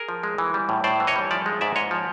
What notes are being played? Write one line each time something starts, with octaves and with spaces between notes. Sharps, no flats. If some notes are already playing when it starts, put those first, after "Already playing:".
Already playing: G#4 A#4
F3
G#3
E3
G3
A2
A2 C5 D5
E3
C#5 D#5
G3
F3 D5 E5
G#3
G#2 D5 E5
G#2 C#5 D#5
F3